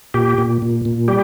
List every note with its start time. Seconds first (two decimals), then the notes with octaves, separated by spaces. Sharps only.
0.14 A#2 G4
0.38 A#2
0.62 A#2
0.85 A#2
1.08 G3 G4